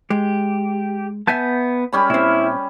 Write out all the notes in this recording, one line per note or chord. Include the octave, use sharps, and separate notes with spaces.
G#3 G4
B3 E5 G#5 A5 G6
G3 C#4 B5
A#2 C4 E4